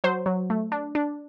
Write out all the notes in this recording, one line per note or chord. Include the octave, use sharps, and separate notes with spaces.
F#3 C5
F#3
A3
D4
D4